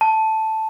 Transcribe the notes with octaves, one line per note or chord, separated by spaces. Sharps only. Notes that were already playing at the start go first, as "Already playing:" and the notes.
A5